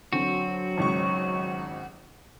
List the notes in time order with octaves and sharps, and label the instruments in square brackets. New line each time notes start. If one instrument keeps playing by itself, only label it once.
[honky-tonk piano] D3 C4 [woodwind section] F#3 [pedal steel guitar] F#4
[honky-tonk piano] G#1 C#2 C#6